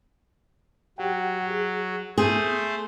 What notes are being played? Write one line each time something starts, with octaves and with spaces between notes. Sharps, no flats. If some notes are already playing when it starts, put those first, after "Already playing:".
F#3 G4 F#5 G5
G#4
A3 B3 G#4 C5